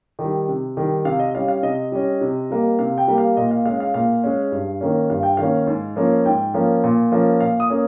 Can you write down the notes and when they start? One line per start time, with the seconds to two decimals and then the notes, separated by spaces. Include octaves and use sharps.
0.19 D#3
0.24 G3
0.48 C3
0.77 D#3 G3
1.05 C3 F5
1.19 D#5
1.35 G3 C#4 F5
1.48 F5
1.63 C3 D#5
1.92 G3 C#4
2.21 C3
2.50 G3 A#3
2.79 C3 F5
2.98 G5
3.08 G3 A#3
3.18 F5
3.37 A#2 D#5
3.51 F5
3.65 G#3 C#4 F5
3.80 F5
3.94 A#2 F5
4.24 G#3 C#4
4.52 G2
4.81 D#3 A#3 C#4
5.10 G2 F5
5.23 G5
5.37 D#3 A#3 C#4 F5
5.67 G#2
5.96 F3 A#3 C#4
6.25 G#2 G5
6.54 F3 A#3 C#4
6.84 A#2
7.12 F3 A#3 C#4
7.40 A#2 F5
7.60 D#6
7.70 A#3 C#4